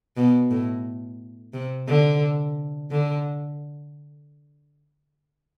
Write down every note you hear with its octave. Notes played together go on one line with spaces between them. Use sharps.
B2
A2
C3
D3
D3